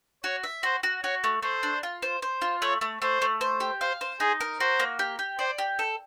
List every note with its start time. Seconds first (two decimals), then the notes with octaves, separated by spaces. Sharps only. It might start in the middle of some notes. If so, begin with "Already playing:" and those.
0.24 F#4 C#5
0.44 E5
0.63 F#4 C5
0.83 F#4
1.03 F#4 C#5
1.24 A3
1.42 A3 C5
1.63 D4
1.83 F4
2.02 C5
2.22 C5
2.41 F4
2.62 A3 C#5
2.81 A3
3.02 A3 C5
3.22 A3
3.41 C5
3.60 G4
3.81 C5 F5
4.01 C5
4.20 D#4 G#4
4.40 A#4
4.60 F#4 C5
4.80 A#3
4.99 G4
5.19 G4
5.39 C5 D5
5.58 G4
5.79 A4